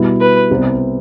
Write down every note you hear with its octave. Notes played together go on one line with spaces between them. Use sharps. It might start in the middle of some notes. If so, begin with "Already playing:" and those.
Already playing: B2 G3 B3 E4
B4
C2 C3 G3 B3